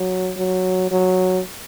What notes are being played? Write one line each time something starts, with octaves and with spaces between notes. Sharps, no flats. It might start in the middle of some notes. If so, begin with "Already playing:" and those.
Already playing: F#3
F#3
F#3